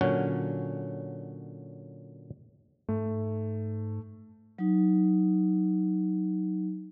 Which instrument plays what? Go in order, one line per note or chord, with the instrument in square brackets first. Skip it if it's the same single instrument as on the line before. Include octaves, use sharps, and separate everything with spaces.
[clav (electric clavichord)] A#2 D3 F#3 C#4 F#5
[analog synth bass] G#2 [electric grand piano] A3
[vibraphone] F#3 D#4